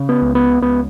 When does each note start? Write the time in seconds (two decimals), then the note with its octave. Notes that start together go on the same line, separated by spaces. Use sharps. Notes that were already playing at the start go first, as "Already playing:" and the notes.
Already playing: C#3
0.09 B3
0.22 C#2
0.35 B3
0.61 C#2 B3